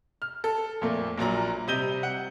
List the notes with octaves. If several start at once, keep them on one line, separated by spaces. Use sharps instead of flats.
F6
A4
F2 A#2 A3 A#3
A#1 A#2 F#3 A#5
C3 G3 D#5 G6 D#7 G7
F#5